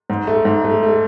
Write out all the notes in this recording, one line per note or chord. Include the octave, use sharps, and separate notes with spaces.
G#2
A3
G#2
A3
A3